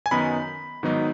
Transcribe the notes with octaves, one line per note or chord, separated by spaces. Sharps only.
G#5
F#2 D#3 B3 D#4 B5
G#2 D#3 F#3 B3 D#4